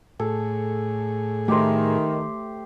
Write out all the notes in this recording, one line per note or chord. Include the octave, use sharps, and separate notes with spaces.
A2 G#4 A4
D#3 A3 G4 C5